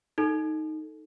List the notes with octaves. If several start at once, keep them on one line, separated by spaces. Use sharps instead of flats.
D#4 A4